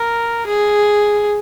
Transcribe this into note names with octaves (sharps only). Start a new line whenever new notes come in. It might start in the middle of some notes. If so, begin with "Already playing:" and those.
Already playing: A#4
G#4